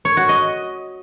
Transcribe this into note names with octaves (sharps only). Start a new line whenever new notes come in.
C#5
F#4
D#5